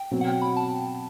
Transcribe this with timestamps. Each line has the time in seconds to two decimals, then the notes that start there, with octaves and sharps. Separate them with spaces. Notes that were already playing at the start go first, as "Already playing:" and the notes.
Already playing: G5
0.11 B2 F#3 C4
0.21 F#5
0.27 G5
0.42 B5
0.57 A5